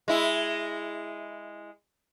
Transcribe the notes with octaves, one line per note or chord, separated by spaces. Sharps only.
G#3 E4